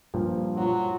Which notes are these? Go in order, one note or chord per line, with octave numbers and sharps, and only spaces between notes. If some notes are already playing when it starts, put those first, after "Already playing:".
G2 A#2 F3
F#3 F4